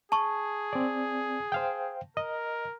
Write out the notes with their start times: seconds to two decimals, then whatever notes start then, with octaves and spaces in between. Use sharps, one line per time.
0.12 G#4 A5 C#6
0.73 C4 D5
1.52 C5 F5 G5
2.17 A#4 D#5